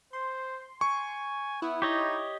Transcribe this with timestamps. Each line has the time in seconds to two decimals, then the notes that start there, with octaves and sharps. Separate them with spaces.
0.13 C5 C6
0.81 G#5 C#6
1.62 B3 E4
1.82 D#4 G4 C#5 D#5